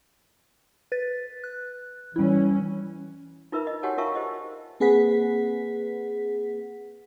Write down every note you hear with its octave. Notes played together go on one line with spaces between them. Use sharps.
B4 A6
F#6
E3 G3 C#4 E4
D#4 F4 A#4 B4 E5 B5
D#5
F#4 G4 C#5 F#5 G#5 A5
F4 A#4 E5 F5 A5 C#6
G4 C5 D#5
A#3 C4 G#4 B4 F#5 B6